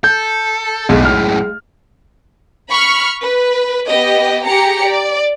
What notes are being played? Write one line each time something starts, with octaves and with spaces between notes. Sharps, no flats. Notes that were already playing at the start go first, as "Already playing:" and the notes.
A4 G6
B1 F#2 A2 G#3 G#4 F5
F6
B5 C#6 F6
B4
B3 G4 D#5
G4 G#4 A#5 C#7
D5